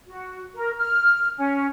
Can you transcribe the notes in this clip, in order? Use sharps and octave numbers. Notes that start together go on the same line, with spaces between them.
F#4
A#4
F6
C#4